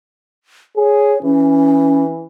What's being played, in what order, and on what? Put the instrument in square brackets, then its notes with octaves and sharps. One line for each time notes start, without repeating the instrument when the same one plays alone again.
[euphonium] G#4 [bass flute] C#5
[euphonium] E3 [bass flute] C#4